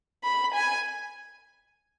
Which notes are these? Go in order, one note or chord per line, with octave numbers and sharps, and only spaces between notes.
B5
G#5